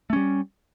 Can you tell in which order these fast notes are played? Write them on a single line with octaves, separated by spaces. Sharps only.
A3 C#4 G3